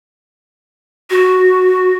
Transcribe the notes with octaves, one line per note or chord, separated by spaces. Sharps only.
F#4